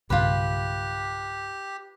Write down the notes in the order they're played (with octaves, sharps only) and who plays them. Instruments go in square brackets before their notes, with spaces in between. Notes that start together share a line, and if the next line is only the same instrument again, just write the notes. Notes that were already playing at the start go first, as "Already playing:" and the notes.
[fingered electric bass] B1 G2 C#3 [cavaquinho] F4 B4 [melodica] G4